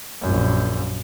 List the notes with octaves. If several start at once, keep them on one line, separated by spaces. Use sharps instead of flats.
A#1 F#2